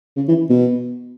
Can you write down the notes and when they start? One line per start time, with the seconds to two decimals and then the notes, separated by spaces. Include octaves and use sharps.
0.16 C#3
0.28 E3
0.49 B2